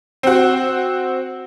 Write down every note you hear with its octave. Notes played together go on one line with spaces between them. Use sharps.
C4 F#4